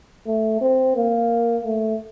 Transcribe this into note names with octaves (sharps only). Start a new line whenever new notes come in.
A3
C4
A#3
A3